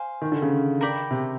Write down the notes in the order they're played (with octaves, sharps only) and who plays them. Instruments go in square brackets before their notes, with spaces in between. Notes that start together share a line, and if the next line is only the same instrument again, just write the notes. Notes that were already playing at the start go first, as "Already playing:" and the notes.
Already playing: [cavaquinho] C5 F5 G#5
[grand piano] D#3
D3
C#3
[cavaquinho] A#4 D5 G5 B5
[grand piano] C3